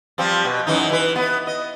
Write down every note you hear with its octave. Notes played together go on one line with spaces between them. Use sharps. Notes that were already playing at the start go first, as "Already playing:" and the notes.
F3 G3 C4
B2
F#2 E3 D#4
E3 B4
B3
D#5